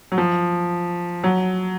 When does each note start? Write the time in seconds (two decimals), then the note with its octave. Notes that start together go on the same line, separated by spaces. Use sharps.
0.12 F#3
0.18 F3
1.24 F#3